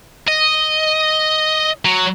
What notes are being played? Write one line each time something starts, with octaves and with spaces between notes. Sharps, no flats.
D#5
F#3